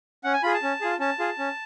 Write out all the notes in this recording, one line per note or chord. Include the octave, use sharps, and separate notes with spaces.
C#4 F#5
G#5
F4 G#4 B5
A5
C#4
F4 G#4
C#4 A5
F4 G#4
C#4